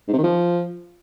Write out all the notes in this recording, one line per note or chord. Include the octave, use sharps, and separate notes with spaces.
G#2
C3
D#3
F3